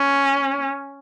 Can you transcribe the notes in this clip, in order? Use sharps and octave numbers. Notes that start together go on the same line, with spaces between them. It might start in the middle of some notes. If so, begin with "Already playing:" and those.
Already playing: C#4